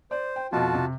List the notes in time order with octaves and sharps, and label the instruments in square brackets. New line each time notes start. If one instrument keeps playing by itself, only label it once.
[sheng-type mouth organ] C5 [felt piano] D5
[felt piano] G5
[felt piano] F2 B2 [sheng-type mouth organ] F4 F#4 A5
[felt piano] C3